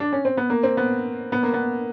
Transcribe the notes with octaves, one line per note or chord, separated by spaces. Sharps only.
D4
C#4
C4
B3
A#3
C4
B3
B3
A#3
B3